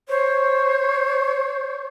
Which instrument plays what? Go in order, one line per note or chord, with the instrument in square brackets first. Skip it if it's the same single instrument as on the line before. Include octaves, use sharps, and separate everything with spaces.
[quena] C5 [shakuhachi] C#5